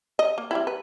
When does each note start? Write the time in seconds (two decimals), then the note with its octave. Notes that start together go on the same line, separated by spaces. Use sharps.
0.19 D#5
0.38 A#3
0.51 G3 C4 E4
0.67 B4